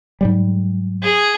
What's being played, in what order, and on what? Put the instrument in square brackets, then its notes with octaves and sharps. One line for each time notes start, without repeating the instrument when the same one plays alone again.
[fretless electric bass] G#2 F#3 G3
[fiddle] G#4